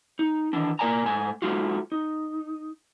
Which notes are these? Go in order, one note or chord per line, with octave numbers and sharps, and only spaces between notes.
D#4
D#3 E3 D4
A#2 A#3 A#4 D5 G#5 A#5
G#2 A3 G#5
G#3 A3 D#4 F4 F#4
D#4